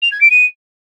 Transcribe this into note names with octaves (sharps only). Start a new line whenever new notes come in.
F7
G#6
D7
D#7